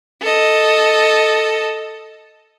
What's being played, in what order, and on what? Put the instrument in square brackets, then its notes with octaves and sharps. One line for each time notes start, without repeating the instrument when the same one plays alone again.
[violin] A4 D#5